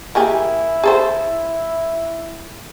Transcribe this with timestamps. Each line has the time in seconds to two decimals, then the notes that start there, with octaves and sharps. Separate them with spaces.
0.15 A#3 E4 G4 G#4
0.84 G#4 A4 C5